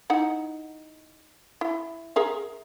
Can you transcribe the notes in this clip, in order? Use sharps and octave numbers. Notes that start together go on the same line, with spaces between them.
D#4 E4 F#5
E4
G#4 A#4 E5